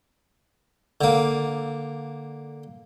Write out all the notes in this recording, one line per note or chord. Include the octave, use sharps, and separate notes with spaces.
D3 A#3